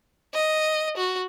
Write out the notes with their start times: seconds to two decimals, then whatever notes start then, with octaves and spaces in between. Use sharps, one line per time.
0.34 D#5
0.97 F#4